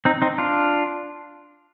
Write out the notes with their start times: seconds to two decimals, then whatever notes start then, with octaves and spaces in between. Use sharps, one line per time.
0.05 C4 D#4
0.22 C4 D#4
0.38 D4 F4